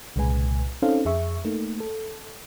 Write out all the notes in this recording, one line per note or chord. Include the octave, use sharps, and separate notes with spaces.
C2 A#2 C#3 G#3 B4 G#5
C4 C#4 D#4 A4 C5 F5
F2 G#4 E5 C#6
A3 A#3 D#4
A4